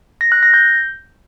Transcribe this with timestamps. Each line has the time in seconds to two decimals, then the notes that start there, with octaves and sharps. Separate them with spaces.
0.21 A#6
0.32 F#6
0.43 A#6
0.54 G6